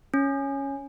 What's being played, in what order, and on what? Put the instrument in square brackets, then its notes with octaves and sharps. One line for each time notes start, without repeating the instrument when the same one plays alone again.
[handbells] C#4